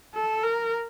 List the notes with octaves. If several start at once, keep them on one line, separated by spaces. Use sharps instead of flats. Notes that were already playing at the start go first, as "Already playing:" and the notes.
A4
A#4